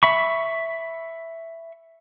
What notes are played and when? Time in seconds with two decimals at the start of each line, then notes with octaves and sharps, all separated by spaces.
0.03 E5 B5 C#6